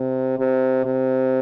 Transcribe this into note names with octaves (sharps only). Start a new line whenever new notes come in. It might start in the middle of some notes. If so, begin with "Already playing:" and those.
Already playing: C3
C3
C3